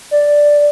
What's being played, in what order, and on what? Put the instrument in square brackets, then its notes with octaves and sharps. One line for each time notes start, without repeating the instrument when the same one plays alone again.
[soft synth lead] D5